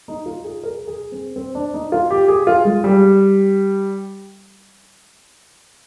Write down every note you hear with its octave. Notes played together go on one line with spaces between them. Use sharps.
D#4
F4
G#4
A#4
G#4
C4
C4
D4
D#4
F4
G4
G#4
F4
G#3
G3